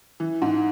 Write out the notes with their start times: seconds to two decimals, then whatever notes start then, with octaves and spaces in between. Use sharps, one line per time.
0.20 E3
0.42 G#2